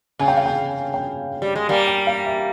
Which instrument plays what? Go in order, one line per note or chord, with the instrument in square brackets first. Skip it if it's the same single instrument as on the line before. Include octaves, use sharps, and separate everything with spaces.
[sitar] C#3 [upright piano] G#5
[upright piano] G5
F5
G5
G5
[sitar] G3
G#3
[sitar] G3 A#3 [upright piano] G#5
[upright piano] G5
F5
E5